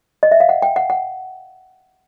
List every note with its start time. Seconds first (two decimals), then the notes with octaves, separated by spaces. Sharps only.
0.23 D#5
0.32 E5
0.40 F5
0.49 F#5
0.62 G5
0.76 F#5
0.90 F#5